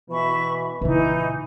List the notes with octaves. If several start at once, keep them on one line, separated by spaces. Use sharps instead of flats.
B2 E3 E5 B5 C#6
A#2 C#3 E3 D#4